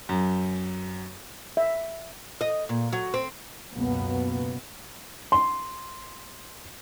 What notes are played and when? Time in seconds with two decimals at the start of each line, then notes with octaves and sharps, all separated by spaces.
0.09 F#2
1.57 E5
2.41 D#5
2.69 A#2
2.93 F#3
3.14 C4
3.73 C#2 F#2 B2 A#3 B3
5.32 C6